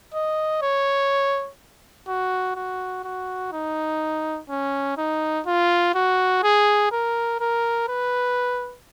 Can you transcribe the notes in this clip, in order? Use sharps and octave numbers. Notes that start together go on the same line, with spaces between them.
D#5
C#5
F#4
F#4
F#4
D#4
C#4
D#4
F4
F#4
G#4
A#4
A#4
B4